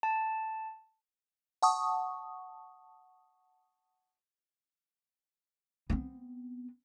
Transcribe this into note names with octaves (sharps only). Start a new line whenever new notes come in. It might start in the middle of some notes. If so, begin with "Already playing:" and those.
A5
F#5 A5 C#6 D#6
B3 C4